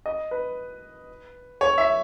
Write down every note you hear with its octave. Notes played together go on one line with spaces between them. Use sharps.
D#5
B4
C#5
E5